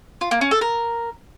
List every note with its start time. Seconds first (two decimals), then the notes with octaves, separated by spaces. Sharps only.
0.21 F4
0.31 A#3
0.41 C#4
0.51 A4
0.61 A#4